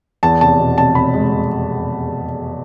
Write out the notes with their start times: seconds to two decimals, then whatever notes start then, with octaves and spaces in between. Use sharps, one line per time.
0.23 E2 A5
0.41 F1 A5
0.60 B2
0.77 F1 A5
0.95 F1 B5
1.14 G#3
1.31 F1